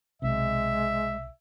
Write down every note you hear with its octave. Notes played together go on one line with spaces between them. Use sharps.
B1 C3 G#3 E5